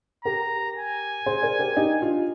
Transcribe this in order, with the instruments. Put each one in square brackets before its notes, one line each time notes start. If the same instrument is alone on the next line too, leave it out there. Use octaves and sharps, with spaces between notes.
[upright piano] G4 A#4 [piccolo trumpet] A#5
[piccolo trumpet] G#5
[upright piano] G#4 C5
A#4 D5
G4 A#4
D#4 G4
D4 F4